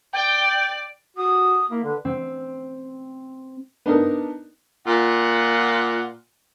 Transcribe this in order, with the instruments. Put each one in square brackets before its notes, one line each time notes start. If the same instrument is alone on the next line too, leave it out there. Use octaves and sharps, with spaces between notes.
[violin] D5 [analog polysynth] G5
[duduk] F#4 [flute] D#6
[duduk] A#3 [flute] E4
[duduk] D3 [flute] B4
[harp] C4
[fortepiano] B3 D4 D#4 A#4
[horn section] A#2 F4 F#5